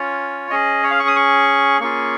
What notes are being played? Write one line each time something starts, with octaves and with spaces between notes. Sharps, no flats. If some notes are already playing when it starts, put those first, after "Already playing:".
Already playing: C#4 F4 C#5
C#4 G#4 D#5
C#5
F5
C#6
D#6
C#6
A#3 C#4 F4 G#4 C#6